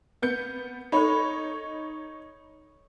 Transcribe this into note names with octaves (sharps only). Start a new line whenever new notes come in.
B3 G6 C#7
D#4 A4 C#5 B5